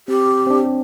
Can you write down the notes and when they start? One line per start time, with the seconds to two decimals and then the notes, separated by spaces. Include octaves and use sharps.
0.08 C4 G4
0.47 C4
0.50 D4